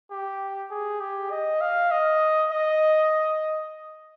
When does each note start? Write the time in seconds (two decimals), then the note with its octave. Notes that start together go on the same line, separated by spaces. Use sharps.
0.11 G4
0.71 G#4
1.01 G4
1.31 D#5
1.61 F5
1.91 D#5
2.51 D#5